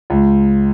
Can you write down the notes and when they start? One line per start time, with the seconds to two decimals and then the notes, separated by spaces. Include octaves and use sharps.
0.10 C#2